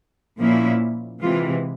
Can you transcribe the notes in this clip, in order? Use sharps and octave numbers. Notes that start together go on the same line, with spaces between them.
A#2 F3 A#3 C#4 E4
C3 E3 G#3 F4